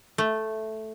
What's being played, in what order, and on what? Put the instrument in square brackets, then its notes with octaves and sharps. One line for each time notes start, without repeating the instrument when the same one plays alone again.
[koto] A3